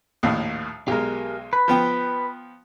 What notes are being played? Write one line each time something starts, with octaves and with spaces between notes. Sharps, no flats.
A#1 D#2 A2
B1 G#3 G4 G#4 A#4
B4
F3 B3 G5